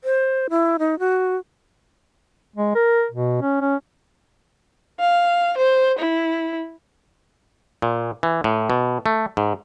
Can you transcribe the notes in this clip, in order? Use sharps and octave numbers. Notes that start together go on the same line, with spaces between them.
C5
E4
D#4
F#4
G#3
A#4
B2
C#4
C#4
F5
C5
E4
A#2
E3
A2
B2
A3
G#2